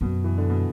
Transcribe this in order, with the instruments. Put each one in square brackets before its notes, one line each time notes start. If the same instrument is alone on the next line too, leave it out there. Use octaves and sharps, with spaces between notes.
[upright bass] F#2 [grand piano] B2
[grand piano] E3
D3
B2